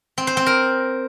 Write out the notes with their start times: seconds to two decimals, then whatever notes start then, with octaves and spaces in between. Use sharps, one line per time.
0.18 C4
0.27 C5
0.37 C4
0.46 A#4